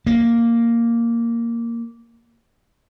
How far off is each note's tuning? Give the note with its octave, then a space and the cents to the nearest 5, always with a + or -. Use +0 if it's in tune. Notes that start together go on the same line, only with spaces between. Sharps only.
A#3 -5